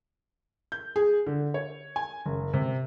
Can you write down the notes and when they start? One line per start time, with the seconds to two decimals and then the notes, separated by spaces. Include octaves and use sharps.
0.72 G6
0.96 G#4
1.26 D3
1.54 C#5
1.96 G#5
2.26 F#1
2.54 C3